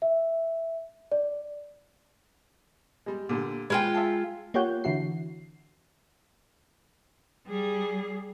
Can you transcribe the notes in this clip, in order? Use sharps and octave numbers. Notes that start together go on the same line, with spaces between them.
E5
D5
G3 G#3
A#2 D3 G3
G#3 F4 B4 G5 G#5
E5 F5 A5
A#3 F4 G4 C#5 F#5 G6
D3 E3 E4 F#4 C7
G3 G#4